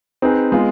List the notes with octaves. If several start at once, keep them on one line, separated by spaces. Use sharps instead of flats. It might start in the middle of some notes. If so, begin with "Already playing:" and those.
C4 D#4 G#4 B4
G#3 B3 F4